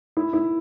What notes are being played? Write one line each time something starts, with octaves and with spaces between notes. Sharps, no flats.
E4
E4